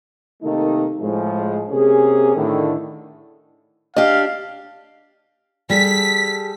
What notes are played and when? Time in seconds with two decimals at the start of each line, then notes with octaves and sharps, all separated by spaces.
0.42 C3 D#3 A3 A#3 D#4
1.01 A2 F3 G#3
1.69 C3 A#3 C#4 G#4
2.35 A2 D3 D#3
3.96 D4 G4 D#5 F5
5.70 G3 G#4 A4 B6